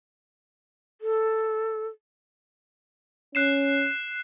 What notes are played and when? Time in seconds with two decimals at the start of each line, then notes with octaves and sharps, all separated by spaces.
1.01 A4
3.35 C#4 F#6 C7 E7